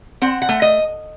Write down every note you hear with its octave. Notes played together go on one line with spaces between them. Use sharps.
C4 F#5
F#5
A3
D#5